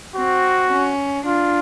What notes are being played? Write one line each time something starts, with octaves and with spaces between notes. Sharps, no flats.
C4 F#4
C#4
D4 F4